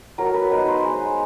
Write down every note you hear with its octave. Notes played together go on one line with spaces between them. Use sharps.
F#3 A#4
B4
B3 D#4 B4
C5
G#3